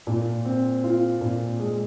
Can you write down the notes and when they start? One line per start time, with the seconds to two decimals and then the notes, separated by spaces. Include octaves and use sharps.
0.07 A#2
0.45 C4
0.84 F4
1.21 A#2
1.59 G#3